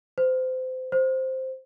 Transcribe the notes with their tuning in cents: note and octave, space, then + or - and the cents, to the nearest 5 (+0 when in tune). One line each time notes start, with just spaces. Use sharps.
C5 -25
C5 +0